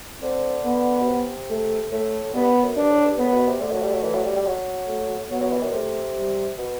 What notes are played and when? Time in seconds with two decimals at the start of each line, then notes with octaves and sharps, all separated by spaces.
0.22 D3 C4
0.65 B3
1.01 B2
1.07 C3
1.50 A3
1.92 A2 A3
2.34 G2 B3
2.63 F#2
2.76 G2 D4
2.90 A2
3.05 G2
3.19 A2 B3
3.33 B2
3.47 C3
3.61 D3 A3
3.72 F#3
3.82 G3
3.92 F#3
4.03 E3
4.14 F#3
4.25 G3
4.36 G3
4.47 F#3
4.88 A3
5.30 F#3 B3
5.41 F#3
5.52 E3
5.63 F#2
5.73 C3 A3
6.15 G3
6.58 B2